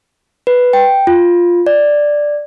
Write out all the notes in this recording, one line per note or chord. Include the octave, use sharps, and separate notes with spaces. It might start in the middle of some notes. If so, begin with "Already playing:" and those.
B4
G5
F4
D5